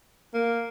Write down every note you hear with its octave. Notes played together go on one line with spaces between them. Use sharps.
A#3